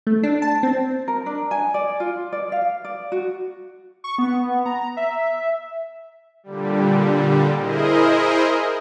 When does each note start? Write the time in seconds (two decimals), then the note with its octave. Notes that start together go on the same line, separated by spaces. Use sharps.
0.07 A3
0.23 D4
0.42 A5
0.63 C4
1.08 A#4
1.26 D4
1.51 G#5
1.74 D5
2.00 F4
2.32 D5
2.52 F5
2.85 D5
3.12 F#4
4.04 C#6
4.18 B3
4.66 A#5
4.97 E5
6.43 A#2 D3 G3
7.56 E4 G#4 A#4 C5 D#5